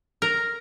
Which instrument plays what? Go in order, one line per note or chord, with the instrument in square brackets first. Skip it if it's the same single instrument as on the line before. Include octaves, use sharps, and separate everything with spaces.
[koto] A#4